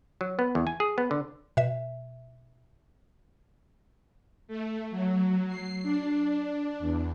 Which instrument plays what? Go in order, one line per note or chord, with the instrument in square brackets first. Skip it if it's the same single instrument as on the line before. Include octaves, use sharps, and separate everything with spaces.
[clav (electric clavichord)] F#3
B3
E2
G#5
G#4
B3
D3
[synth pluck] B2 E5
[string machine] A3
F#3
C7
D4
E2